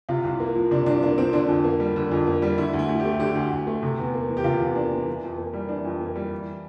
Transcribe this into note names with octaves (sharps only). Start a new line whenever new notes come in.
C3 F4
C2
A#3
F3
C3 D4
C2 D4
A#3 D4
F3 C4
D3 D4
F2
A#3
G3
D3
F2
A#3
G3
D3 E4
D2
E4
D2
G4
A3
D3 G4
D2
D2
A3
C3
E2
A#3
E3
G4
C3 F4
E2
A#3 D4
E3
E3
F2
A#3
G3
E3 D4
F2
A#3
G3
E3